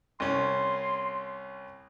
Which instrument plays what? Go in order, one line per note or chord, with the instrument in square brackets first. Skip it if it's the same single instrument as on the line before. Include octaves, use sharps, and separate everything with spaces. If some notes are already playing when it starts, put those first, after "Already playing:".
[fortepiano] C2 C#4 [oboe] C6